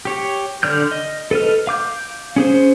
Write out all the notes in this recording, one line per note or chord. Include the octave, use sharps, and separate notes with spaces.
G4 C#5
D3 D5 F6 G6
D#5
A4 B4 D#5 F6
F5 D6 G6
C#4 G#4 C5